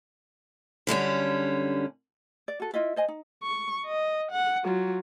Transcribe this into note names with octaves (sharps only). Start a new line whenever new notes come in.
F#2 D3 G3 C#4
D5
F#4 A4
E4 F4 D#5 E5
C5 D#5 G#5
D#4
C#6
D#5
F#5
F#3 F4